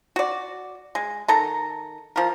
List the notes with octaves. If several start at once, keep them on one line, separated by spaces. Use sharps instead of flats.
F#4 D5
G#3
D#3 A4 A#5
F3 A#4